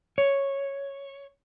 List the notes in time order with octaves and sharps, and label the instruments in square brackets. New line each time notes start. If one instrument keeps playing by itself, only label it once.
[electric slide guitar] C#5